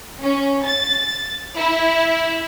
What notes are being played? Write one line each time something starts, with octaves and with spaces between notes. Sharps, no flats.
C#4
A6
E4